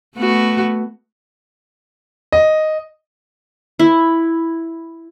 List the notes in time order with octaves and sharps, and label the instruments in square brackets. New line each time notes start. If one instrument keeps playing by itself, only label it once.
[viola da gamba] A3 B3 F#4
[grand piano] D#5
[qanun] E4